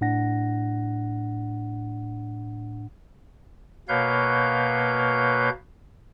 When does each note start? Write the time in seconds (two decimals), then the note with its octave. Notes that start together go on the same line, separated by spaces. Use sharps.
0.01 A2 D4 F#5 A#6
3.88 B2 A#3 B4 C#5 F5 G6